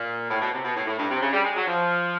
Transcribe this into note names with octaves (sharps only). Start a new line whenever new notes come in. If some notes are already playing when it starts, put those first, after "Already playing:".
Already playing: A#2
A2
B2
C3
B2
A2
A2
G2
C3
C#3
G3
G#3
F#3
F3